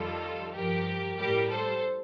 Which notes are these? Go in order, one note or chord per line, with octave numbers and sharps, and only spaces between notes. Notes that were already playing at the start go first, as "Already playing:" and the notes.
Already playing: F2 D#3 G3 F4 A4
G2 F3 G4 A#4
A2 G3 G4 A#4
A4 C5